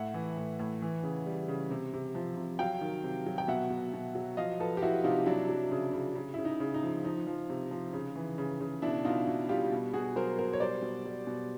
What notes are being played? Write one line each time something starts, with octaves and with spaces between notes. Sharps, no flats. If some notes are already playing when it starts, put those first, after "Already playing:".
Already playing: A2 E5 F#5
E3
A2
A2
E3
C#3
G3
C#3
C3
C3
F3
C3
F#3 F5 G5
D#3
C3
F#3
G5
B2 E5 F#5
B2
B2
F#3
F3 D#5 F5
F3 A4 B4
G4
F3 E4 F#4
C3 D#4 F4
F#3 D4 E4
F#3
C#3
C#3
C#3
C#3 E4
D#4
C#3
D#4
F3
F3 D#4
F3
C3
F3
C#3
E3
C#3
C#3
B2 D4 E4
B2 D#4 F4
B2
G3 F4 G4
B2
B2 F#4 G#4
F#3 A#4 C5
B2 A#4 C5
C#5
G3 C5 D5
B2
G3
B2